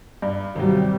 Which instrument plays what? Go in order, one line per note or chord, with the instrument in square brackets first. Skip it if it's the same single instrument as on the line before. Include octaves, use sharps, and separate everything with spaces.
[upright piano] G2
[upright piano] G#1 F#3 [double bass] C3 G3